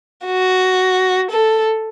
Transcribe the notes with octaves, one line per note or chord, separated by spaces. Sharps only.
F#4
A4